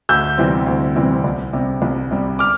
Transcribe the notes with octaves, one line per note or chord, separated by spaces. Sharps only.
D2 E6 G6
C3 E3 G3 C4
D2
C3 E3 G3 C4
C2
C3 G3
C2
C3 G3
D6 F6